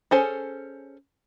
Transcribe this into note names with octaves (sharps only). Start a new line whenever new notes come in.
C#4 G#4 A4 C5 G#5